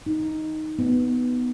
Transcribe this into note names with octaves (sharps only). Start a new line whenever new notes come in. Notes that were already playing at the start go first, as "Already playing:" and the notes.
D#4
B3